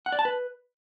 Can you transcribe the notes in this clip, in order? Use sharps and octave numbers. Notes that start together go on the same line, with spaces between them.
F#5
D5
A5
B4